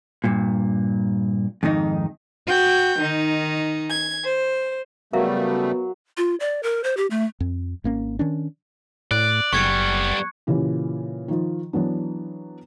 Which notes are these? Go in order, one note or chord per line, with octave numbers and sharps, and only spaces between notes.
G2 A#2
F2 G#2 D#3 D#4
F#4 G5 G6
D#3 D#4
G#6
C5
C#3 F#3 G3 A3 B3 A#4 E5 F5
F4
D5
A#4
C5
G4
A3
F2
G#1 A#3 C#4
D#3 C#4 D4
A2 D5 F#6
F#1 G3 B3 C#6 G#6 C#7
A#2 C#3 E3 G4
D#3 F3
E3 F#3 B3 D4